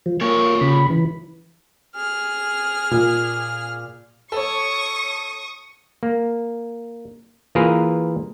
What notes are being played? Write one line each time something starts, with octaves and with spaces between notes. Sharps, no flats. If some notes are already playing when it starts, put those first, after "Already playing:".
F3
A#2 A#3 C#5
C#3 B5
E3
G#4 F6
A#2
A4 C#5 C#6 D#6
A#3
E3 A#3 F4 G#4 A#4 B4